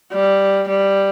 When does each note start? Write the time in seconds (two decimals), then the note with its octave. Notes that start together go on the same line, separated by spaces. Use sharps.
0.13 G3
0.69 G3